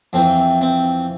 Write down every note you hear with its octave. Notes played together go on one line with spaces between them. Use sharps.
F2 E3 C4
C4